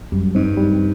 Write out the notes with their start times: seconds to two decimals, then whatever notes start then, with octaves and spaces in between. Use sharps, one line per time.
0.12 F#2 G3
0.35 G2 C4 D#4
0.57 G3